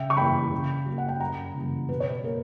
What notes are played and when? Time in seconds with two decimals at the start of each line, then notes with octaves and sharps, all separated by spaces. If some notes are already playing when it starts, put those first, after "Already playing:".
Already playing: C#3 E5 G5
0.10 C#6
0.17 E3 A#3 G5 B5
0.52 C#3
0.86 F#3 A#3
0.98 F#5
1.08 G5
1.20 F#2 F#5 A#5
1.54 C#3 E3 G3 A#3
1.89 B2 B4
2.00 C#5
2.10 B4
2.23 A#3 A#4